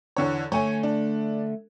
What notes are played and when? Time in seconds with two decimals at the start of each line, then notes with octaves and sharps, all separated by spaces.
0.17 E2 D3 C#5
0.52 D3 A3 C#5 G#5
0.83 D4